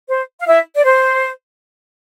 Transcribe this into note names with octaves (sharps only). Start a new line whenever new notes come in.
C5
F5
E4 E5
D5
C5